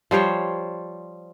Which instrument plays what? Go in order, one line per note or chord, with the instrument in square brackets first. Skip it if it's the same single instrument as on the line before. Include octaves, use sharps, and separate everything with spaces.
[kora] F3 G3 C5 C#5